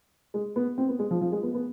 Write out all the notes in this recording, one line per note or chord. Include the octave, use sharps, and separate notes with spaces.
G#3
B3
C4
B3
G#3
F3
F3
G#3
B3
B3